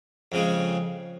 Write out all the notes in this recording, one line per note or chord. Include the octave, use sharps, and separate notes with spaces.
F2 C#3 G#3